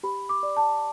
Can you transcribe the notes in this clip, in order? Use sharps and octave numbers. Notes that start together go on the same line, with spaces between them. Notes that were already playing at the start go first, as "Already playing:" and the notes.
G4 B5
D6
D5
A5